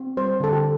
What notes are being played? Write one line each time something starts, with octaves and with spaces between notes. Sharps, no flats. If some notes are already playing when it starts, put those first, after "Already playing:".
Already playing: C4
G3 C5
D3 A4
G4